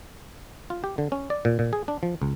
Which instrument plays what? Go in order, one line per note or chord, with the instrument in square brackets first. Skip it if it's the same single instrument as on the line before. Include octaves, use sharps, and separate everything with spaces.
[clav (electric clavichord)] F4
G4
D3
C#4
D5
A#2
A#2
G#4
D4
F3
C#2